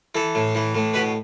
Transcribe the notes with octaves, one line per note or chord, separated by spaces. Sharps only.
E3 A4
A2
E3
A2
B2 B4